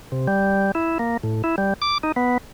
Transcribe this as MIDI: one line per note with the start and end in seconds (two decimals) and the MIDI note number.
0.12 0.28 48
0.28 0.71 55
0.75 0.98 64
0.99 1.17 58
1.23 1.42 45
1.44 1.56 64
1.58 1.73 55
1.82 1.98 86
2.03 2.12 63
2.16 2.38 59